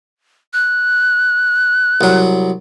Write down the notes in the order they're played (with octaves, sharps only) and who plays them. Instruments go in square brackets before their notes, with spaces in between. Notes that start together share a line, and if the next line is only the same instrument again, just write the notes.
[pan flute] F#6
[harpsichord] C2 F#3